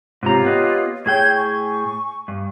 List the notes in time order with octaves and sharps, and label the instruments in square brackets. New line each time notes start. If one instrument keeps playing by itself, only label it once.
[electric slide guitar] G#2 C3 A#5 [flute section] F4 G4 C#5
[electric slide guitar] B3 B4 D#5
[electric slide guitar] A2 G#4 G5 [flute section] C#5 G#6
[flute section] G#5 C#6
[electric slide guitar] G2